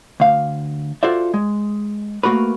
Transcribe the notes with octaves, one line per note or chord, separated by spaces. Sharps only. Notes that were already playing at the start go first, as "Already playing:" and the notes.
D2 F5
F4 F#4 A4 C5 D5 E5
G#3
A3 A#3 F#4 A#4 B4